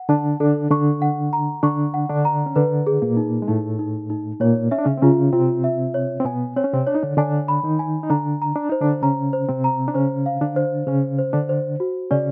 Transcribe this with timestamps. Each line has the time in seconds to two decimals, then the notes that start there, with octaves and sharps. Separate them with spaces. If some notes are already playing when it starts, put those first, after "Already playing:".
Already playing: F#5
0.09 D3 D4 A5
0.40 D3 D4 A4
0.70 D3 D4 C#6
1.02 F#5
1.33 A#5
1.63 D3 D4 C#6
1.94 F#5
2.09 D3 D4
2.25 A#5
2.46 C#4
2.56 D3 D4 B4
2.87 G#4
3.02 A#2 A#3
3.17 D#4
3.42 G#3
3.48 A2 A3 D#4
3.79 D#4
4.10 D#4
4.40 A#2 A#3 C#5
4.71 C#4 E5
4.79 D4
4.85 C#3 C#4
4.98 C4
5.02 C#3 C#4 F4
5.33 C3 C4 F4
5.64 E5
5.94 C#5
6.20 C4
6.25 B2 B3 G#5
6.56 C4 C#5
6.64 C#4
6.73 C3 C4
6.87 D4 C#5
6.95 D#4
7.03 D3 D4
7.17 D3 D4 G#5
7.48 B5
7.64 D#3 D#4
7.79 G#5
8.03 D#4
8.10 D3 D4 A#5
8.42 A#5
8.56 D4
8.69 D#4 C5
8.81 D3 D4
9.02 C#3 C#4 A#5
9.33 C5
9.49 C3 C4
9.64 A#5
9.88 D4
9.94 C#3 C#4 C5
10.26 F5
10.41 D3 D4
10.56 C5
10.87 C#3 C#4 C5
11.18 C5
11.33 D3 D4
11.49 C5
11.80 F#4
12.11 C#3 C#4 D5